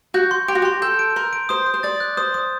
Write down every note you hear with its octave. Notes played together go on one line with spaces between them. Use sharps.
F#4 G6
C6
G4 D7
F#4
G4 C6
A4 G6
D7
A#4 C6
D7
C5 D#6
D#6
C5
D5 A6
F#6
C5 D#6
D#6